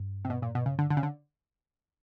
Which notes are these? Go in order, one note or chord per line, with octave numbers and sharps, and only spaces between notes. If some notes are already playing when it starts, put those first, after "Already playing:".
Already playing: G2
C3
B2
A#2
B2
C#3
D3
D3
C#3
D3